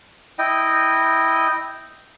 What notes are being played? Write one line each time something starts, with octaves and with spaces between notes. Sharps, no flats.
E4 D#5 G5